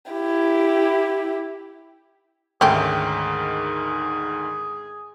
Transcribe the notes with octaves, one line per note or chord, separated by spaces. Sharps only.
E4 G4
D2 G#2 D#3 A3 C#4 G4 G#4